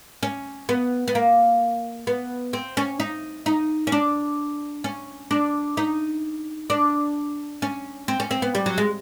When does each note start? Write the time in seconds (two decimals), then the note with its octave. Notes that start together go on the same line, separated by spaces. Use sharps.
0.23 C#4
0.69 B3
1.08 B3
1.15 A#3
2.07 B3
2.53 C4
2.77 C#4
3.00 D#4
3.46 D#4
3.87 C#4
3.92 D4
4.84 C#4
5.31 D4
5.77 D#4
6.70 D4
7.62 C#4
8.08 C4
8.20 C#4
8.31 C4
8.42 B3
8.55 G3
8.66 F#3
8.78 G#3